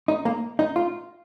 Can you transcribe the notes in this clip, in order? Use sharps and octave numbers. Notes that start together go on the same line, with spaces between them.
D#4
A#3
D#4
F4